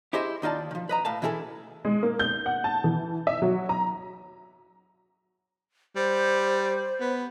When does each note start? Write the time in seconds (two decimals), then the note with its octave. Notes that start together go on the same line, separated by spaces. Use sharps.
0.13 E4 G4 G#4 C5 D#5 E5
0.42 D#2 D#4 F4 D5 A5
0.71 D#3 F3
0.89 B4 D#5 A#5
1.05 A2 F5 A5
1.22 E3 C#4 E4 G#4 A4
1.85 G#3
2.03 A#3
2.19 G6
2.46 F#5
2.64 A5
2.84 E3
3.27 E5
3.42 F#3
3.69 A#5
5.96 G3 C5
7.00 B3